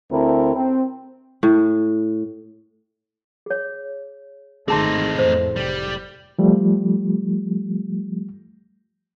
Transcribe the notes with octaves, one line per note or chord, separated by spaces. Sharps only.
D2 C4 E4 A4 A#4
C4
A2
G#4 C#5
G#1 D#3 A3 C4 D#4 G#4 A5 C6
F2 A2 C5
F1 G3
F3 G3 A3